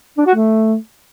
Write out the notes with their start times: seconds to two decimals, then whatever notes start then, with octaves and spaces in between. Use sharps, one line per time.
0.17 D4
0.26 F#4
0.35 A3